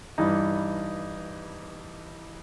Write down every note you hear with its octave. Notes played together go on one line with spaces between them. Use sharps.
G2 E3 G3 D#4